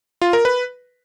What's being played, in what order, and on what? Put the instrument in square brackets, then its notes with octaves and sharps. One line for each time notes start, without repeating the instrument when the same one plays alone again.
[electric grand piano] F4
A#4
B4